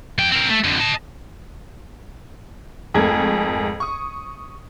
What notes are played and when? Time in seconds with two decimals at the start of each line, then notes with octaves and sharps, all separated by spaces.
0.18 F3 G5
0.32 C4 A#4
0.50 A3
0.64 F2 D3
0.80 D#5 A5
2.94 F2 G#2 A3 G#4 A#4 G#6
3.80 C#6 D#6